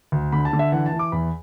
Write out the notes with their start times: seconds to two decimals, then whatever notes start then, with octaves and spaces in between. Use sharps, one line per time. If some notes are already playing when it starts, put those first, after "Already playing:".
0.12 D2
0.32 D3 B5
0.45 A5
0.53 D3
0.59 E5
0.72 E3 F#5
0.86 A5
0.93 E3
0.99 D6
1.12 E2 B5